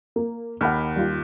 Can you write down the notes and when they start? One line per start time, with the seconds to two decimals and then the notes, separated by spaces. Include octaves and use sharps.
0.16 A#3
0.61 D#2 F#5 B5 F6
0.96 G3 F4